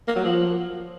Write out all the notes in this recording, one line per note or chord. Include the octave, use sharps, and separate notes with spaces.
A#3
F#3
F3